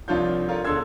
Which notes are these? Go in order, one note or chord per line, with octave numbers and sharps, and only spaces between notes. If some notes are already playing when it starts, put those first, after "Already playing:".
C2 F3 D4 F4 C#5 G6
D4 F4 A4 A#4 C#5
E1 D3 A4 C6 E6 G#6